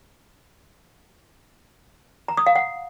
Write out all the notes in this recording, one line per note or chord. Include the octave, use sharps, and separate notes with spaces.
A#5
D#6
F5
F#5